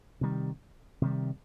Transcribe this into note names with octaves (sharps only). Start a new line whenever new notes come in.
C3 D#3 G3
C3 D#3 G3